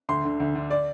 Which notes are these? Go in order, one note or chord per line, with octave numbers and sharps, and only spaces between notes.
D2 C6
D3
D2
D3
D5